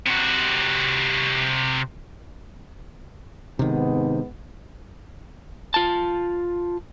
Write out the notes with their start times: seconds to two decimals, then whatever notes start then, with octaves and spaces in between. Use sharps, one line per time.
0.07 C3 F#4
3.59 G#2 C3 D#3 B3
5.74 F4 A5